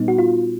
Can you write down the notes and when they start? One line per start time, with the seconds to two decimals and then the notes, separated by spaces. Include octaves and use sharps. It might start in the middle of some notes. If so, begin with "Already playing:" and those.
Already playing: A#2 G3 B3 D#4
0.08 F#4
0.18 F4